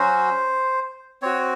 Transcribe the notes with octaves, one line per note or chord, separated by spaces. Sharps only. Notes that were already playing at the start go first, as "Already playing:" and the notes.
Already playing: F#3 C#4 F#4 C5
C4 F#4 C#5